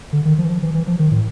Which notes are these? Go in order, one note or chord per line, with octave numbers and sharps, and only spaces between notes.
D3
D#3
F3
E3
F3
E3
E3
F3
D#3
A2